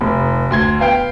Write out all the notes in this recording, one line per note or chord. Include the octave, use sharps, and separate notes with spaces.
F1
D2 C6 G#6
B3 F5 G5